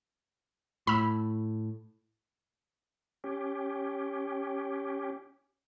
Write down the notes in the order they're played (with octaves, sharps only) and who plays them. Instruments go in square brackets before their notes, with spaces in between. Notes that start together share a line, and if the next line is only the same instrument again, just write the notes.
[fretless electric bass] A2 [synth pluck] B5 E6
[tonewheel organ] C#4 G4